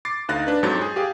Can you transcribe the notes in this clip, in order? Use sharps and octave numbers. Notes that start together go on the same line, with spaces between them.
D6 A6 C7
D2 D#4 F5 F#6 A6 A#6
D4 B4
F2 G#2 F#3 G6 A6
G#4
G4 G#4 F5